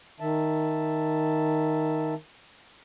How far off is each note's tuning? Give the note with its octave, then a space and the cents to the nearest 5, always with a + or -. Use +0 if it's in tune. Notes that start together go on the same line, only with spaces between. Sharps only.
D#3 +0 E5 +0 A5 +0